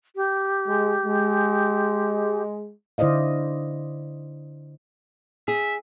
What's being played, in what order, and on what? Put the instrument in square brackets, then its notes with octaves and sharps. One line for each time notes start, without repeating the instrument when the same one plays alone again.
[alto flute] G4
[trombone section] G#3
G#3
[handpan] D3 E4 C5 D5 D#5 F5
[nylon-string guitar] G#4 [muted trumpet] E5